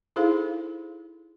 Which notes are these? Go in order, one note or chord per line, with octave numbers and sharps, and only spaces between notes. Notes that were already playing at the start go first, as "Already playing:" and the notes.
D#4 E4 G#4 A4 C5 F5